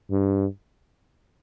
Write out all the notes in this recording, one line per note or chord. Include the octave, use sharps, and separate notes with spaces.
G2